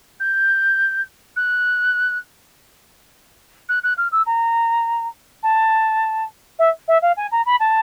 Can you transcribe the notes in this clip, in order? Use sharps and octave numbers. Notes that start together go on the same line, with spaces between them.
G6
F#6
F#6
F#6
F6
E6
A#5
A5
E5
E5
F5
G#5
A#5
B5
A5